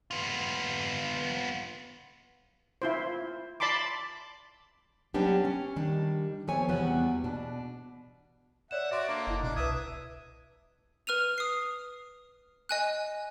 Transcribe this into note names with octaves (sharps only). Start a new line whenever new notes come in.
B3 F4
E4 F4 C5
D5 A5 B5 C6 D6
F#3 G3 B3 C#4 D4 G4
C#4
D#3 G3 D4
F3 B3 C4 A4 C#5 G#5
E2 C3 G3 B3 F#4
B2 D4
C#5 D5 E5 F#5 E7
F#4 D5 E5 C6
D3 A#3
F#1 E4 D#5
B2 D4
C2 B4 E5 D#6 G#6
B4 F6 D#7 F7
D#6 C7
D#5 G#5 F#6